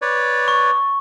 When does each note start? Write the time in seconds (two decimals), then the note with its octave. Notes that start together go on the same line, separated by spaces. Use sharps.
0.02 B4 C#5 D5
0.48 C#6